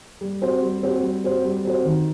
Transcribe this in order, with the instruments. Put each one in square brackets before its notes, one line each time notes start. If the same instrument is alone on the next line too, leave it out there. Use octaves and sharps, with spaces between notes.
[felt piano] G3
C4 F#4 C5
G3
C4 F#4 C5
G3
C4 F#4 C5
G3
C4 F#4 C5
D#3